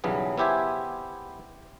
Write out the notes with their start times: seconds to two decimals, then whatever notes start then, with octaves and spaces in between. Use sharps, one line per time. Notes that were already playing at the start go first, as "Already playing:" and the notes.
0.04 B1 C#3 E3 F#3 G3 B3
0.38 B3 E4 G4 C5 E5 G#5